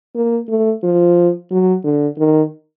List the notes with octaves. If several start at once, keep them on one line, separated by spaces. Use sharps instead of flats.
A#3
A3
F3
F#3
D3
D#3